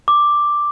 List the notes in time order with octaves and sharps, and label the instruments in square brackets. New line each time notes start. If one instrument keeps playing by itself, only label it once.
[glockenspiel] D6